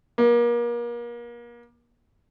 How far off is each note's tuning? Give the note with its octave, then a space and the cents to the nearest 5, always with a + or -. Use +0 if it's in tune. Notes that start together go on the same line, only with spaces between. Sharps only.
A#3 +35